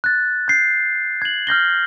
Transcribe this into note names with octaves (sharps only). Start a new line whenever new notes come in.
F#6 A6
G6 C7
G#6 F#7
F6 G6 A#6 G7